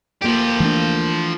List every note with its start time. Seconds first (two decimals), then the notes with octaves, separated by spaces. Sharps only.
0.22 D2 F3 A#3 F4 G4
0.60 E3 A3 D4